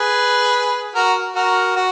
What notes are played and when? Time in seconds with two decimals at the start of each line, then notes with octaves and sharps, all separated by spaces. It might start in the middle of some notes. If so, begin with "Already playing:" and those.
Already playing: G#4 B4
0.95 F#4 A#4
1.36 F#4 A#4
1.76 F#4